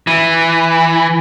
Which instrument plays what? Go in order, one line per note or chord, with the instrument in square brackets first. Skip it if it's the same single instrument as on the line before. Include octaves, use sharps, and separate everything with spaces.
[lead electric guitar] E3